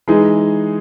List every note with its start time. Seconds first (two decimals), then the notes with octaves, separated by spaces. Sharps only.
0.08 E3 G#3 D#4 G#4